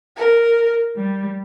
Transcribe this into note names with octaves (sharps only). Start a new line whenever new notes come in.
A#4
G3